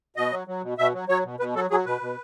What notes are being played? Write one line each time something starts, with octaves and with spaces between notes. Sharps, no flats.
B2 D#5
F#3
F#3
B2
B2 E5
F#3
F#3 C#5
B2
B2 B4
F#3 A4
F#3 G#4
B2 B4
B2